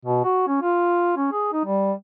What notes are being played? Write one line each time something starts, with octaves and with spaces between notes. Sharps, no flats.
B2
F#4
C#4
F4
C#4
G#4
D#4
G3